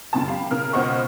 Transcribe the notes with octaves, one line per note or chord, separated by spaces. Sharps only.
C#2 F#2 C#3 A5
G4 F5 B5
C#3 A#4 F6
C#2 B2 C5 D#5 F#5 C#6